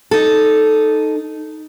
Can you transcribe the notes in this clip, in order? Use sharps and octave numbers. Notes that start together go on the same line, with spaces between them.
D#4 A4